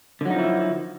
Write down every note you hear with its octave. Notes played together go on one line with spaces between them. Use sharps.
D3 F3 F#3 D#4 E4